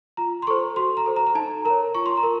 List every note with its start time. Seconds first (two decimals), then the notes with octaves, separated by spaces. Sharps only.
0.17 F4 A#5
0.42 C6
0.47 A4 C5 C#6
0.76 F#4 C6
0.97 A#5
1.06 A4 C5
1.16 A#5
1.27 A#5
1.35 D#4 A5
1.65 A#4 A#5
1.70 C#5
1.95 F4 C#6
2.06 C6
2.17 A#5
2.23 A#4